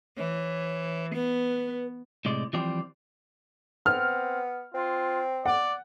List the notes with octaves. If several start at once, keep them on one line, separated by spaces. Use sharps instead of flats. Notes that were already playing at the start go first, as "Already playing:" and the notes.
E3 C#5
B3 B4
A2 C3 G#3 D5
E3 F3 G3 C4 D5 G5
B3 C4 F6
C4 F4
D5 F#5